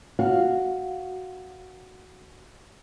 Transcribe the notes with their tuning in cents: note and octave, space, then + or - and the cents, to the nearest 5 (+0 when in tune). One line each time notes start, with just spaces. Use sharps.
F#4 +0 F5 +0